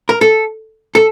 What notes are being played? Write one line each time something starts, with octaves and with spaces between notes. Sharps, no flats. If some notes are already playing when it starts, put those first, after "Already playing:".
A#4
A4
A4